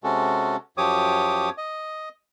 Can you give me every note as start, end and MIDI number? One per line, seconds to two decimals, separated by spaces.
0.04 0.56 48
0.04 0.56 56
0.04 0.56 61
0.04 0.56 66
0.04 0.56 69
0.77 1.50 42
0.77 1.50 53
0.77 1.50 67
0.77 1.50 73
0.77 1.50 86
0.77 1.50 87
1.58 2.09 75